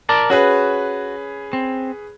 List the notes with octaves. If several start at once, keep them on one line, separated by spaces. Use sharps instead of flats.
A#4 D5 A5
C#4 F#4 G#4 B4
C4